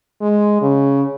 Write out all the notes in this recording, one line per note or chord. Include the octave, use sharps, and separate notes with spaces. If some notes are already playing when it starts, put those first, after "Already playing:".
G#3
C#3